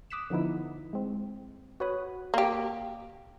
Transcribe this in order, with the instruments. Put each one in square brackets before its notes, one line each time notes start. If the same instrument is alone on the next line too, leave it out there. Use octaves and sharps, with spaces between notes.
[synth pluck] D6 D#6 F#6 B6 C#7 E7
D3 F3 B3 D#4 E4
G#3 C4
F#4 B4 C#5 B5 D#6 F#6
[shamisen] A#3 G4